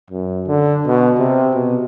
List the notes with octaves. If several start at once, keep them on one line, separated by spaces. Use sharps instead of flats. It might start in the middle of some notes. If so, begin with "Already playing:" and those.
F#2
D3
B2
C3
B2